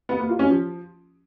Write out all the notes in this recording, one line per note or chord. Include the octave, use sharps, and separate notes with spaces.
B3
A#3
F4
C#4
F3